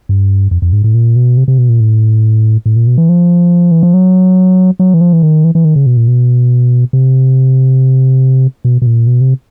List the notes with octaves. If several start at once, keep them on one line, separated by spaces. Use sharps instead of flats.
G2
F2
F2
G#2
A2
A#2
B2
C3
C3
B2
A#2
A2
A2
A#2
B2
E3
F3
E3
F3
F#3
F#3
E3
F3
E3
D#3
E3
E3
D#3
C#3
B2
A#2
B2
C3
B2
B2
A#2
B2
C3